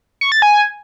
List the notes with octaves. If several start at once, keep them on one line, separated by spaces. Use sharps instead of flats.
C#6
A6
G#5